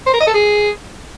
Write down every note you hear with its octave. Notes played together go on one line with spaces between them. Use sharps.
C5
A#4
D#5
A4
G#4